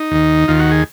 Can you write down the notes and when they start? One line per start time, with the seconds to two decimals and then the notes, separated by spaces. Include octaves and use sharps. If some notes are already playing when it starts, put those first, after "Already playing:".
Already playing: D#4
0.11 D#2 D#3
0.48 D#2 D#3 F4
0.59 F#4
0.71 G#4